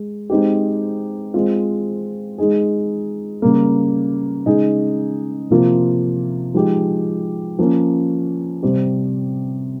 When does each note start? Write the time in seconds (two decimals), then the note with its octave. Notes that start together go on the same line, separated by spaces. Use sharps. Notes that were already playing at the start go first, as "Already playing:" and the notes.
Already playing: G#3
0.30 G#3 C4 D#4 G4
1.34 G#3 C4 F4
2.38 G#3 D#4 G#4
3.42 C#3 G3 A#3
4.46 C#3 G#3 D#4 G#4
5.50 C3 F3 A#3 F4
6.54 F3 G#3 D#4 G4
7.59 F3 A#3 C#4
8.63 C3 G3 C4 G4